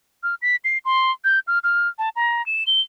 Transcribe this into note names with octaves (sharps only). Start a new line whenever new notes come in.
F6
B6
C7
C6
G6
F6
F6
A5
A#5
E7
G7